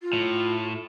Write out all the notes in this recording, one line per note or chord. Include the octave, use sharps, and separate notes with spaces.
F4
A2